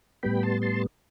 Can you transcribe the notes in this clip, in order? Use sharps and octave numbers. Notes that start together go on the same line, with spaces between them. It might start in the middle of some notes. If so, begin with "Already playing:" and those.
A2 G3 B3 G5 B5
A5 C6
A5 C6